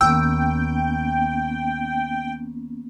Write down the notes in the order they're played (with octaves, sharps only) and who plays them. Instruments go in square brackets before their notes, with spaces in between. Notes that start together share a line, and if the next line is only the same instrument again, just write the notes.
[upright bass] D#2 [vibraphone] A#3 B3 C#4 [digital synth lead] G5 [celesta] E6